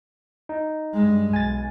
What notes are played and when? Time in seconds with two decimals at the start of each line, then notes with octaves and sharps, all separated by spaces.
0.49 D#4
0.94 G2 G#3
1.33 B1 G#5 A6